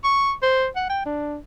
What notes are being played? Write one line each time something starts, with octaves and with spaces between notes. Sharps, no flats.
C#6
C5
F#5
G5
D4